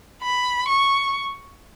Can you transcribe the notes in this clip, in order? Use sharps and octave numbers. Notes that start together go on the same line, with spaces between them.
B5
C#6